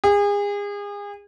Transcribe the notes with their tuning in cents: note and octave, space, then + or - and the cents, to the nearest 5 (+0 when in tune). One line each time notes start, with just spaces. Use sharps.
G#4 -35